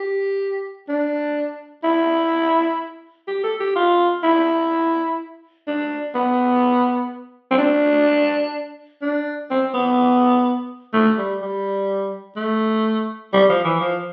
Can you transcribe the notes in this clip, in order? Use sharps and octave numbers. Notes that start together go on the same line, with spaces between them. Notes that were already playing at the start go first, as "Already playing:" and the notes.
Already playing: G4
D4
E4
G4
A4
G4
F4
E4
D4
B3
C4
D4
D4
C4
B3
A3
G3
G3
A3
G3
F3
E3
F3